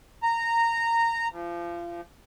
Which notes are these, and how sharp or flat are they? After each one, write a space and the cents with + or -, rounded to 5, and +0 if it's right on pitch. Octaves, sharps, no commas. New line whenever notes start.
A#5 -15
F3 -30